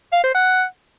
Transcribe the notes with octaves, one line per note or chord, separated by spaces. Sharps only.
F5
C5
F#5